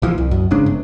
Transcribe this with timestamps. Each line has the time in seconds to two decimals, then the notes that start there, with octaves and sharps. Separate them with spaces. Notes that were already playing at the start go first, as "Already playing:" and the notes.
0.02 A#1 E3 F3
0.18 C2
0.31 F#2
0.51 G#1 G#2 C#3 D4
0.66 G1